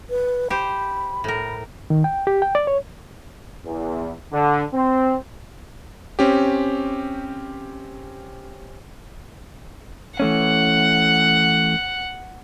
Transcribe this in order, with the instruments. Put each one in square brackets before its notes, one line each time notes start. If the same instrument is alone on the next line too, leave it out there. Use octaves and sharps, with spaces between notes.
[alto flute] B4
[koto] G4 C5 [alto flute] B5
[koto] A2 A#4
[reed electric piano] D#3
G5
G4
G5
D5
C#5
[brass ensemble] E2
D3
C4
[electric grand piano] C4 C#4 G4
[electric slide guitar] E3 A3 C#4 [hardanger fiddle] F#5